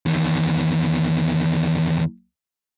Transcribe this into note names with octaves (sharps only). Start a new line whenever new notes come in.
E2 D#3